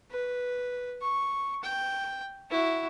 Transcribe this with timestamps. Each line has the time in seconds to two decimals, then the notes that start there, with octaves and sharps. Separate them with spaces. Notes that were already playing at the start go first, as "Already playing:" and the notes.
0.11 B4
1.02 C#6
1.64 G5
2.51 E4 F#4